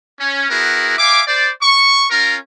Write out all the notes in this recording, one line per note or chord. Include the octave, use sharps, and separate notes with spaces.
C#4
B3 E4 F#4 G#4 A#4
E5 F5 G#5 D6
C5 D5
C#6
C#4 F4 A#4